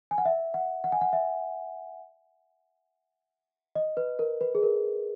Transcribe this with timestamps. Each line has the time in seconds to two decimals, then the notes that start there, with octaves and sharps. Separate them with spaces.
0.11 G#5
0.18 F#5
0.25 E5
0.54 F#5
0.84 F#5
0.92 G#5
1.01 F#5
1.13 E5
3.75 D#5
3.97 B4
4.19 A#4
4.41 B4
4.55 G#4
4.63 A#4